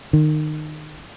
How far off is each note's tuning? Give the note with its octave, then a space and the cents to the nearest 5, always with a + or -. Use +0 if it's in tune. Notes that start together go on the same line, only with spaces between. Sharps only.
D#3 -25